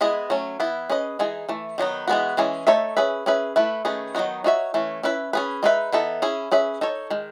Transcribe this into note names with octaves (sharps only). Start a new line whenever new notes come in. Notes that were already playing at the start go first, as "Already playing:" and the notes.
G#3 B3 E4 G#4 D#5
F#3 A3 C#4
E3 B3 E4
C#4 G#4 B4 D#5
E3 G#3 D#4 G#4
E3 A3
D#3 F#3 B3 D#4
E3 G#3 B3 F#4
E3 G#3 C#4 G#4
A3 D#4 A4 C#5 E5
C#4 G#4 B4 E5
C#4 G#4 B4 E5
A3 E4 B4 E5
D#3 A3 C#4 G#4 B4
D#3 F#3 B3 D#4 F#4
D#4 F#4 C#5 E5
E3 A3 C#4
C#4 E4 B4 E5
C#4 G#4 B4
G#3 D#4 G#4 B4 E5
E3 B3 D#4 A4 E5
C#4 E4 G#4
C#4 G#4 B4 E5
D#4 A4 C#5
D#3 G#3